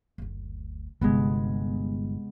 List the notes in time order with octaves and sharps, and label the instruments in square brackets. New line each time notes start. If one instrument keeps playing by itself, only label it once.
[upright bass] F#1 D2
[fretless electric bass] G1 [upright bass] D#2 C3 [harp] G#3 B3